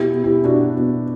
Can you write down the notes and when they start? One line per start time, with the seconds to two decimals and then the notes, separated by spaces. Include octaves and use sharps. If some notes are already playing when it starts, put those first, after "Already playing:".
Already playing: B2 E4 G4
0.13 B2
0.24 E4 G4
0.44 B2 D4 F#4
0.76 B2